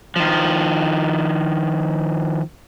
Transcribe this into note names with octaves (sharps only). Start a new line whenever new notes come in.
D#3 F3